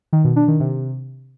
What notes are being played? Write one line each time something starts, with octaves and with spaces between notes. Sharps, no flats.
D#3
B2
D4
D#3
C3